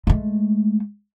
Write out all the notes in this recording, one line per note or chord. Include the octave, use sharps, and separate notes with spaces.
G#3 A3